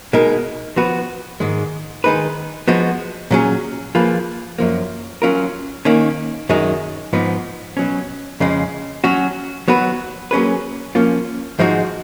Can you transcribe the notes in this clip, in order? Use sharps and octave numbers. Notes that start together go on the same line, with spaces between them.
B2 G#3 D#4 A#4
F3 B3 F#4 B4
G#2 D#3 G#3
D#3 G#3 D#4 G#4 B4
F3 G#3 B3 F#4
A#2 F#3 C#4 G#4
F3 A#3 F4 G#4 B4
F#2 F3 A#3
F#3 C#4 F4 A#4
D#3 A#3 C#4
F#2 D#3 G#3 D#4
G#2 F3 B3 D#4
B2 F#3 C#4
F2 C#3 G#3
F#3 C#4 F#4
F#3 B3 F#4 B4
F#3 A#3 C#4 G#4 B4
F3 A#3 C#4 F4
G#2 F3 G#3 D#4 F#4